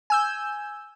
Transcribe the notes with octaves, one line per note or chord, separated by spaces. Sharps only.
G#5 E6 G6